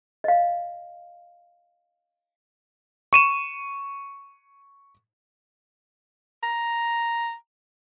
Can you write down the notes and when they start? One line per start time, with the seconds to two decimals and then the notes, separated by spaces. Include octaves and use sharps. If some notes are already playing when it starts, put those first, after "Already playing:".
0.24 D#5 F5
3.13 C#6 D#7 E7
6.43 A#5